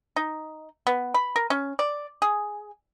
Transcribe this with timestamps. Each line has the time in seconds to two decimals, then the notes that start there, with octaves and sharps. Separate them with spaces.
0.16 D#4
0.87 B3
1.14 B5
1.36 A#4
1.50 C#4
1.79 D5
2.22 G#4